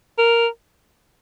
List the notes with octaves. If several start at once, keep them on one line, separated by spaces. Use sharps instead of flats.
A#4